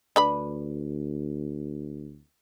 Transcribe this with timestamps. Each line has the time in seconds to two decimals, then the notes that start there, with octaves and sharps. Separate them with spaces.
0.16 D2 D4 B4 B5